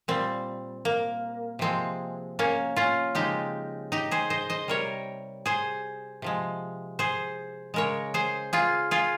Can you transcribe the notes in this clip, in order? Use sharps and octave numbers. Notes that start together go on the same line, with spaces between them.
A#2 G3 C4
A#3
C3 F3 G#3 C4
A#3 C#4
C#4 F4
C#3 F3 G#3 D#4 G4
D#4 G4
G#4 C5
C5 D#5
C5 D#5
C3 G3 A#4 C#5
G#4 C5
C3 F3 G#3
G#4 C5
C#3 G#3 A#4 C#5
G#4 C5
F4 G#4
F4 G#4